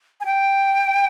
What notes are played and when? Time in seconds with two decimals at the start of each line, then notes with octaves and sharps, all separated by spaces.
0.20 G#5
0.25 G5